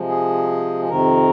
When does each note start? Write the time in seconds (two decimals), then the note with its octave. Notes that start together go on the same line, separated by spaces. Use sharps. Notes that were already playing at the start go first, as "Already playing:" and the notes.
Already playing: C3 F3 G#3
0.08 G#4
0.89 F2 C3 D#3 A#4